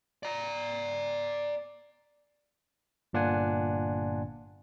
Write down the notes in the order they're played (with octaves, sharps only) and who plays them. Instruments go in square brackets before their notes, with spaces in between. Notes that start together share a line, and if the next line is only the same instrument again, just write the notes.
[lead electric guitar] D5 A#5
[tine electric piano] G1 A#2 D4 F4 F#5 G#5